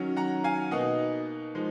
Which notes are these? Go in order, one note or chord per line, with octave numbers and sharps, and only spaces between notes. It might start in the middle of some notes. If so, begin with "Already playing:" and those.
Already playing: D#3 F#3 C#4
F#5 A#5
F5 G#5
B2 A#3 D#4 D#5 F#5
F3 G#3 D#4